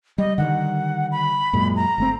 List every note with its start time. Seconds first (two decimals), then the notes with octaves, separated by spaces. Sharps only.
0.18 G3 D#5
0.38 D3 D#3 G3 F#5
1.12 B5
1.53 F#2 A#2 G#3
1.76 A#5
1.98 G1 A3 C4